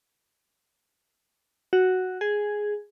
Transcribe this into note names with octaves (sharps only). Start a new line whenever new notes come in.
F#4
G#4